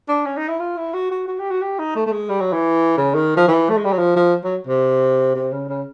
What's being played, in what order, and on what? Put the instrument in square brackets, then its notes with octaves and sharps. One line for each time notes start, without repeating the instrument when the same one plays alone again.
[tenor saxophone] D4
C#4
D#4
E4
F4
E4
F#4
F#4
F#4
G4
F#4
G4
D#4
A3
A3
G#3
G3
F#3
E3
C#3
D#3
F3
E3
A3
G#3
G3
F#3
F3
F3
F#3
C3
C3
C#3
C#3